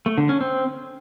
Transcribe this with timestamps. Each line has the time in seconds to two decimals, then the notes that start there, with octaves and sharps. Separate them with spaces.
0.06 A3
0.18 D3
0.29 C#4
0.41 C4